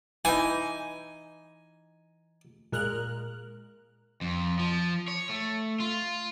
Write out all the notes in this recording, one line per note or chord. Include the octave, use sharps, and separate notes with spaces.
E3 D#4 G#5
A#2 G#3 A#4 F6 F#6
F2
F3
C#5
A3
F4